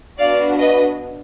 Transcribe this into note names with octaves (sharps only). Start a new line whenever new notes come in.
B3 D4 F#4 D5 F5
B4 D#5